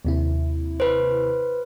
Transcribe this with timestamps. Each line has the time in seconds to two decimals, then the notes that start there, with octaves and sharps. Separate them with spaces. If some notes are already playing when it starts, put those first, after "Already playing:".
0.05 D#2 C3 E4
0.80 B4 C5